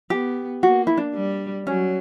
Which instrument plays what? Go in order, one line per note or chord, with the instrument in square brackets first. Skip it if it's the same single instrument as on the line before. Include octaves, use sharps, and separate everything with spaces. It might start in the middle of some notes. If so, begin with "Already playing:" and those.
[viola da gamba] B3 [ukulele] G4
[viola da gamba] A#3 [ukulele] F#4
[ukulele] E4
D4
[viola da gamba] G3
[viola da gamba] F#3 [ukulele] C#4